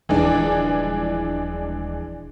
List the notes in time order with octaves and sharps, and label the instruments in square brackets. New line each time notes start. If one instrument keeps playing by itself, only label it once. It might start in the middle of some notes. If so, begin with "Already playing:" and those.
[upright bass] D#1 F3 [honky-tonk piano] E3 G#3 D4